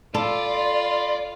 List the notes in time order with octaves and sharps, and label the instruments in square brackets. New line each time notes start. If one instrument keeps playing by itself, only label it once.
[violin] F4 [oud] A4 [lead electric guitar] D5 [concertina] B5 C6